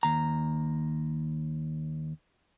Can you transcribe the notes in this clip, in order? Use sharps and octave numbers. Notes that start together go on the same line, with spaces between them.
D#2 A#5